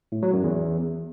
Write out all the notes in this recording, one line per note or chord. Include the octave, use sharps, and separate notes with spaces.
A2
F#3
F#2
E2